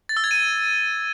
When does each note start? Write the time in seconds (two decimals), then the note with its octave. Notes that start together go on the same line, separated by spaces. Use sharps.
0.09 A6
0.17 E6
0.24 G#6
0.31 D#7